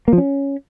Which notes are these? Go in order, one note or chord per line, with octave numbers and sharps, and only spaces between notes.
A#3
F3
C#4